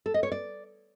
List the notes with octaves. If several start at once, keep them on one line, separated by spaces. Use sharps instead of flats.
A4
D#5
C#5
D5